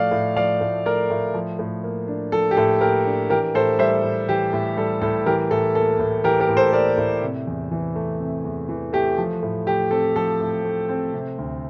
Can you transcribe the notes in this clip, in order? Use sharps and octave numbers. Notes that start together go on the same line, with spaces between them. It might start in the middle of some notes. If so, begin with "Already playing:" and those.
Already playing: A2 F3 A3 D5 F5
A2
F3 D5 F5
A2
A3 A#4 D5
A2
F3
A2
A#3
D4
F3 A4
G4
A2 A4
A#3 G4 A#4
D4
E3 G4 A#4
A2 A4 C5
G3 C5 E5
A2
E3 G4
A2
G3 A4
A2 A4
E3 G4 A#4
A2 A4
A#3 A4
A2
E3 G4 A#4
G4 A#4
A2
A4 C5
A#3 A#4 D5
A2
C3
E2
E3
A3
C3
E2
E3
A3 G4
F3
A2
A3 G4
C4 A4
F3 A4
A2
A3
C4
C3
D2